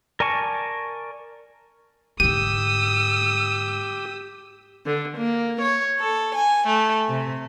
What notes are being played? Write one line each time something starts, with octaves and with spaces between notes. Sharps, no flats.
A#4 D5 G#5 A5 C#6
G#2 D3 G4 D#6 E6 D#7
D3
A#3
C#5
A4
G#5
A3
C3